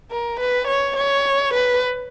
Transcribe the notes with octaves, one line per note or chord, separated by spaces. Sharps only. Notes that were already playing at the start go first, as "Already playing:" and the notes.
A#4
B4
C#5
C#5
B4